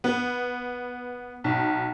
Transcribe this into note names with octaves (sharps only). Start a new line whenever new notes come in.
B3
B1